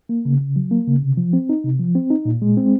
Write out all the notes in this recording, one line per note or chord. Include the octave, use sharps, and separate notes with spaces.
A#3
C#3
C#3
F#3
A#3
C#3
C3
F3
C4
D#4
C3
F3
C4
D#4
A#2
G#3
C4